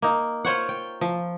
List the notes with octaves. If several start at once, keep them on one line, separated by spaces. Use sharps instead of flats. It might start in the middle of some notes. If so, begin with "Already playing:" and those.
A#3 D#4
F4 C5 C#5 F#5
G5
F3